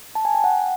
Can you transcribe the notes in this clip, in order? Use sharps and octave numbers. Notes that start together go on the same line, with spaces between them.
A5
G#5
G5
F#5